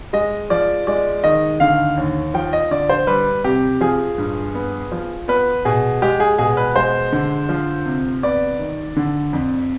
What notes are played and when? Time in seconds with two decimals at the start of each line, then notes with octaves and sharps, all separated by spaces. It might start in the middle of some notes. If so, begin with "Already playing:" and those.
0.13 G#3 D#5
0.50 F3 D5
0.87 G#3 D5
1.24 D#3 D#5
1.60 D3 F5
1.97 D#2
2.34 F3 G5
2.53 D#5
2.71 D3 D5
2.89 C5
3.07 G3 B4
3.44 C3 G4
3.81 F3 G#4
4.18 G2
4.55 B3
4.92 F3
5.28 B3 B4
5.65 B2 G#4
6.02 G#3 G4
6.20 G#4
6.38 B2 G#4
6.57 B4
6.76 G#3 C5
7.12 D3
7.49 F3
7.86 C3
8.23 B3 D5
8.59 D#3
8.96 D3
9.33 F2